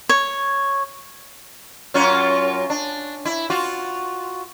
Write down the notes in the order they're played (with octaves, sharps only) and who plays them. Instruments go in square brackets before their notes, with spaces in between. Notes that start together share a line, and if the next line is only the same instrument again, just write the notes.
[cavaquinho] C#5
[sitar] F#2 C#4 F4
D4
E4
F4 F#4